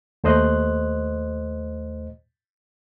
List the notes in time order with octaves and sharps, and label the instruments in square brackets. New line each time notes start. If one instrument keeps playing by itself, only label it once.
[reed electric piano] D#2 A3 C5 D#5 F#6